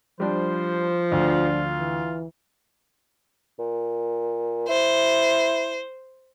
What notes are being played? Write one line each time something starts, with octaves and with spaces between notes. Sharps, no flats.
F3 G3 D4 C5
D2 D4 F4
E3
A#2
E4 C5